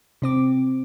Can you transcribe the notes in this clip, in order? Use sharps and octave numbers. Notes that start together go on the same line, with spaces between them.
C3 C4 D6